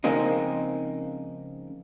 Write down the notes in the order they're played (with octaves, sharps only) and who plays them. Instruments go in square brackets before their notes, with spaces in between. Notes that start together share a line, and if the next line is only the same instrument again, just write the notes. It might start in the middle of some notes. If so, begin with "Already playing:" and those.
[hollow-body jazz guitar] C#3 F3 G#3 A#3 C4 D#4